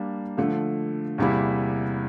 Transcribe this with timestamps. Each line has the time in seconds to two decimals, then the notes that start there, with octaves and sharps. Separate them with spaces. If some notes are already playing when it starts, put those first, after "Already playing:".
Already playing: G3 A#3 D4
0.37 D3 F3 A3
1.18 E2 C3 G3 A#3 E4